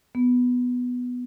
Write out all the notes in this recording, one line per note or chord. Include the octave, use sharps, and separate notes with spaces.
B3